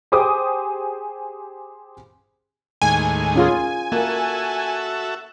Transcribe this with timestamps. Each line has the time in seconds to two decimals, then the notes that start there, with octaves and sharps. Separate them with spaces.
0.12 G4 G#4 C5 G#5 D6 D#6
2.82 D#2 A2 G#3 G#5
3.36 C#4 F4 G#4
3.92 A#3 F#4 A4 E5